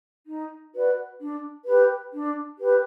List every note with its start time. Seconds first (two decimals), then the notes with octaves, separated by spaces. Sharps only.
0.26 D#4
0.74 F#4 B4 D5
1.20 D4
1.65 G4 B4
2.13 D4
2.58 G4 B4